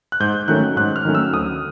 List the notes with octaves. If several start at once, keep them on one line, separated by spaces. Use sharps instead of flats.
F#6
G#2 G6
D#3 F#3 A3 C#4 F#6
G#2 F#6
F6
D#3 F#3 A3 C#4
E6
D2 D#6